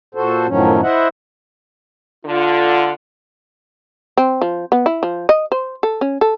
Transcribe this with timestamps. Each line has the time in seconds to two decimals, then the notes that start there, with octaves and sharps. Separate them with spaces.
0.15 A#2 F#4 A4 C5
0.47 F#2 A2 D#3 F3 F#3 C#4
0.83 E4 C5 D#5 E5 F#5
2.25 D3 F4
4.17 C4
4.41 F3
4.72 B3
4.86 E4
5.03 F3
5.29 D#5
5.52 C5
5.83 A4
6.01 C#4
6.21 A4